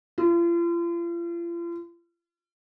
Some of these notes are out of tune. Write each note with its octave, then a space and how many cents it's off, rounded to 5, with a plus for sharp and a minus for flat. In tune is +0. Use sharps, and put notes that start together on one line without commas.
F4 -40